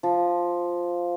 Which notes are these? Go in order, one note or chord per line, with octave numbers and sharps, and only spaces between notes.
F3